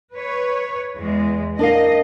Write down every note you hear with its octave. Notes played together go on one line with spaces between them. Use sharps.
B4 C#5
E2 G#3
D4 A#4 D#5 F5